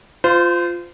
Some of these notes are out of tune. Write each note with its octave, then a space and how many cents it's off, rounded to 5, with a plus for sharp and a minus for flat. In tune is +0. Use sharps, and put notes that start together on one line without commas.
F4 +0 C5 -30